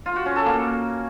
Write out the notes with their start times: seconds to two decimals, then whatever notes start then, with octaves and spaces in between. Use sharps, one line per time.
0.06 F4
0.16 F#4
0.26 C#4
0.36 A4
0.46 A#3